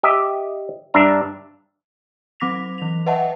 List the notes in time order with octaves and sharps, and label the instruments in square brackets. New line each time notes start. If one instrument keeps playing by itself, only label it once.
[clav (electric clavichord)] G4 D#5 E5
G2 D4 E5 A#5
[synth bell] F#3 C4 D6 A#6 B6 F7
E3 F7
B4 D#5 E5 F#5 G5 A5